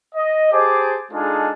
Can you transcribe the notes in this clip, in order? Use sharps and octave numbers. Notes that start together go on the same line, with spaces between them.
D#5
G4 G#4 C5 A5 D6
G#3 D4 D#4 F4 G#4 A4